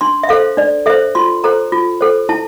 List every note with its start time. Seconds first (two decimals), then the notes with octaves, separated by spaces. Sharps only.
0.01 D4 C6
0.23 E5
0.29 A4 C5 F5
0.57 D4 D5
0.86 A4 C5 E5
1.15 F4 C6
1.44 A4 C5 A#5
1.72 F4
2.01 A4 C5
2.29 E4 A5